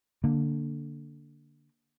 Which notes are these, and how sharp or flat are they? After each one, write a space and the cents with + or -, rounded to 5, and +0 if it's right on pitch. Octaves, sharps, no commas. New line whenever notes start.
D3 +0 A#3 +0